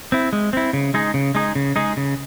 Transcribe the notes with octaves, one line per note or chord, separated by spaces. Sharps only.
C4 E4
G#3
C4 E4
C#3
G#3 D#4 G#4
C#3
G#3 D#4 G#4
C#3
G#3 D#4 G#4
C#3